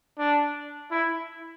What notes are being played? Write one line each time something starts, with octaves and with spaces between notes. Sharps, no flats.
D4
E4